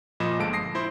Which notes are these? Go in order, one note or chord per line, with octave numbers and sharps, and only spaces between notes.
A#2 F3 D#5 B5 E7
G1 G#3 A4 A5 D7
D#6 A#6 C7
E4 C5 C6